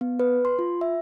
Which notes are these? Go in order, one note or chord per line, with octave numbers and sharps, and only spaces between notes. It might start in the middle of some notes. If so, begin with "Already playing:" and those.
B3
B4
C6
F4
E5